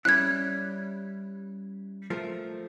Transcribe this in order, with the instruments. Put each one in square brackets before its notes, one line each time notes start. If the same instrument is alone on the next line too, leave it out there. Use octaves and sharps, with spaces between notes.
[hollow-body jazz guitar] G3 C#4 E4 [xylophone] F#6 G#6
[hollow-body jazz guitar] F3 A3 A#4